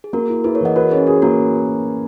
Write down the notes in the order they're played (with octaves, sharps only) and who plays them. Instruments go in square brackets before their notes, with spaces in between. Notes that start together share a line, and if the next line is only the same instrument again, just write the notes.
[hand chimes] G#4
[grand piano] A#3 [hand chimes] F#4 A#4
[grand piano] E4
[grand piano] E4 [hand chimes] G#4 B4
[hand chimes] A#4 C#5
[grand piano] E3 [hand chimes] D#5 F#5
[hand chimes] F#4 A#4 [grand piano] B4
[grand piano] C#4 [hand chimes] G#4
[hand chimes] F#4 [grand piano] G#4
[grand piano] A#3 [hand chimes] F#4 A#4